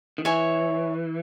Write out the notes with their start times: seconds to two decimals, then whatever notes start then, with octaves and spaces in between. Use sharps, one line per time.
0.18 D#3
0.25 E3 C#5 E5 G#5